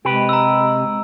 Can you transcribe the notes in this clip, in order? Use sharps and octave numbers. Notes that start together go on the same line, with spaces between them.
C3 G#3 G4 B4
A#5 E6